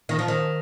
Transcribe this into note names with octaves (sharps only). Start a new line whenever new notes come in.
D#3
F3
D#3